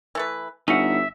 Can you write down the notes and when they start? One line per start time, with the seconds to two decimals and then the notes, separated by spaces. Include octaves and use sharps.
0.15 E3 A3 B4
0.68 G1 C#4 D#4 E5 F#5